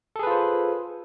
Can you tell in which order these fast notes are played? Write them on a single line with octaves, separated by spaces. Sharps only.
A4 G#4 B4 F4 C5